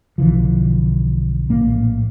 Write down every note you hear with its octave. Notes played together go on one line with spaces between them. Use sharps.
B1 D3 E3 F3
A#1 A2 A#3